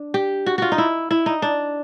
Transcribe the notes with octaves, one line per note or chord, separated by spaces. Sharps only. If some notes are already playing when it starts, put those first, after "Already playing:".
Already playing: D4
G4
F#4
F4 F#4
D#4
E4
E4
D#4
D4